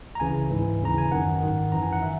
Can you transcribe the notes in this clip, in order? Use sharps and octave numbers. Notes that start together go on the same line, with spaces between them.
A#5
C#2 C#3 E3 G#5
G#2 E3
D#2 C#3 E3 A#5
G#5
F#2 D#3 F#5
G#2 D#3
F#2 E3 A#5
G#5
F#5
D#3 E5